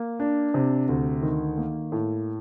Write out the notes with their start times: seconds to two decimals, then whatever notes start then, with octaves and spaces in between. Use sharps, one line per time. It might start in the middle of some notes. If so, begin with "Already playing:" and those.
Already playing: A#3
0.20 D4
0.54 C3
0.89 D2
1.23 D#3
1.58 A#3
1.92 A2